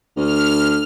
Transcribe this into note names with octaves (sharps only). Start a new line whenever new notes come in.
D2 F6